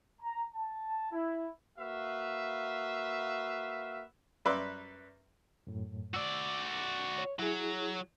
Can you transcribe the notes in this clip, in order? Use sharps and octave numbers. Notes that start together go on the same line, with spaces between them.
A#5
A5
E4
A#3 F#4 B4 E5 F5
F#2 G3 B4 E5 C6 D6
F#2 A2
F#4 D5 E6
C#5
F#3 E4 G#4